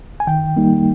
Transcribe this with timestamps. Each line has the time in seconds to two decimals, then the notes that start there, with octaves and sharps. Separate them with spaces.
0.20 G#5
0.27 D#3 G5
0.57 G3 A#3 D#4